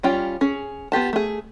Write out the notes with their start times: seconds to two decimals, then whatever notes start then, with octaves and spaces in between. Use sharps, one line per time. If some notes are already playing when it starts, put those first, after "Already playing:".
0.03 G3 C#4 F4 G5
0.41 C#4 G#4
0.92 B3 F4 G4 A5
1.13 A3 G#4